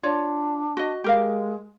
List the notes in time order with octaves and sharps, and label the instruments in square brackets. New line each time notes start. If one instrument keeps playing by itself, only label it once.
[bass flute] D4 [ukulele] F4 C#5 D5
[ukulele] F#4 D#5
[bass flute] G#3 [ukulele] G4 A#4 F5